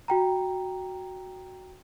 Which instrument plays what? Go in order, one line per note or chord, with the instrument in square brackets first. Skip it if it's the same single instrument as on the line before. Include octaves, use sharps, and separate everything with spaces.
[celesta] F#4 G5 A#5